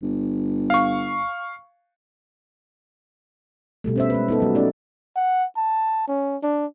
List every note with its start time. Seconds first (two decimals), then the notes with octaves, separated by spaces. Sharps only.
0.02 G1
0.70 F5 C#6
3.84 B2 G3 A3
3.96 C#4 C5 E5
4.10 G#3 B4
4.28 B3 D#4 A4
4.40 F#3 G3
4.55 A3 C#4 D#4 D5
5.16 F#5
5.57 A5
6.08 C#4
6.43 D4